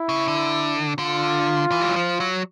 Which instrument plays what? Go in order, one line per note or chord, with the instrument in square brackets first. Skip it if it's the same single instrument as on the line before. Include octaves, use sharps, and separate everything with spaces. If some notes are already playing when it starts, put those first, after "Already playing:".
Already playing: [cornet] E4
[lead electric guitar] C#3
D3
[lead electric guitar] D3 [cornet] F4
[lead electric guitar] E3
G3
F#3
F3
F#3